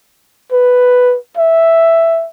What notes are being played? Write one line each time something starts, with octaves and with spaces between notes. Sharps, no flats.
B4
E5